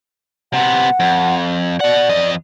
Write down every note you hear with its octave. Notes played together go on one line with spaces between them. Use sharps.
C3 B3 F#5
F2
B2 D5 F#5
F2 D#5